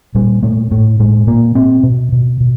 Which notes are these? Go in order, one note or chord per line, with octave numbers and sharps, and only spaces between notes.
A#2 G3
A#2 A3
A2 A3
A2 G#3
A#2 A#3
A#2 C4
B2
B2
B2